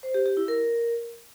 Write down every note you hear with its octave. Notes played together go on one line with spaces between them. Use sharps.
C5
G4
G4
E4
A#4